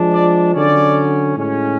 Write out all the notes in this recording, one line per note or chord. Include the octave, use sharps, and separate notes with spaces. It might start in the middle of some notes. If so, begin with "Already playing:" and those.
Already playing: F3 G#3 D4
D5
D3 F#3 C#4 D5
A2 G#3 C#4